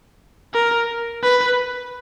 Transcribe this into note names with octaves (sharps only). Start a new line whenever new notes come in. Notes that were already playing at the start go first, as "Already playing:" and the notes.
A#4
B4